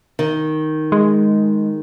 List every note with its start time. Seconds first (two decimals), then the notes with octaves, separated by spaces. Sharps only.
0.19 D#3
0.92 G#3